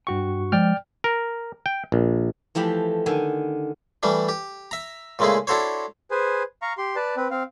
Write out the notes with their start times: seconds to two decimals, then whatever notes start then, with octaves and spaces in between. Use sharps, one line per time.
0.07 G2 F#4 G5 C#6
0.52 F3 G#3 D5 G5 F6
1.04 A#4
1.66 G5
1.92 A#1
2.55 E3 F3 A3 G4 B5
3.06 D3 D#3 G#5
4.03 E3 G3 A3 D4
4.29 G4
4.71 E5 A#5
5.19 A#2 C#3 G#3 A3 E4 G#4
5.47 D4 E4 F#4 A4 C5 C#5
6.11 G#4 B4 C5 G#5
6.62 F5 A#5 C#6
6.78 G4 C6
6.96 B4 D5 A5
7.17 C4 B4
7.31 C4 F5